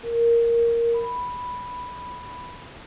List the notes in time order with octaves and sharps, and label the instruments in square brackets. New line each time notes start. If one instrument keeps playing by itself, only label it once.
[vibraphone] A#4
B5